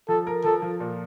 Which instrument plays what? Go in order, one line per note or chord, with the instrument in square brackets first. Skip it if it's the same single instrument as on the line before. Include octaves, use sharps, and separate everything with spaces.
[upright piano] F3 [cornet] A4
[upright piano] A#4
[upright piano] F3 [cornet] A4
[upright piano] F3
A#2